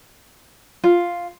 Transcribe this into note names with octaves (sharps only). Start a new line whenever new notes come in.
F4